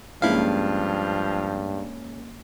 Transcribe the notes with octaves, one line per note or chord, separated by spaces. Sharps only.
G2 F3 G#3 A#3 C#4 E4 F5